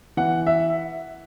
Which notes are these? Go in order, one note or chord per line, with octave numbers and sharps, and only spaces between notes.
E3 F#5
E5